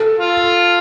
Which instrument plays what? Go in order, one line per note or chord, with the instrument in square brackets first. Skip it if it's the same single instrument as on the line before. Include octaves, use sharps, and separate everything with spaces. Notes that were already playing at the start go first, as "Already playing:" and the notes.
Already playing: [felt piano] A4
[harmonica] F4